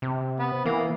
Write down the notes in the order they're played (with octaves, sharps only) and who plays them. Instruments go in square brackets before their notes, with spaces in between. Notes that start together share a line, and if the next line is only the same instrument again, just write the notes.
[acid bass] C3
[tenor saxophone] B3
[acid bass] E3 [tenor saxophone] A#3